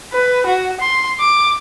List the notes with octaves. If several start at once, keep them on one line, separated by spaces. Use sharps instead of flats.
B4
F#4
C6
D6